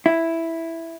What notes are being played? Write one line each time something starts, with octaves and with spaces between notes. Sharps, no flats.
E4